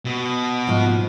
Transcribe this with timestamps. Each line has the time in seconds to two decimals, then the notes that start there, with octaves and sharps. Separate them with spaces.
0.05 B2
0.67 G#2 F3